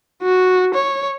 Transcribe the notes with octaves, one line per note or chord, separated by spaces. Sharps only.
F#4
C#5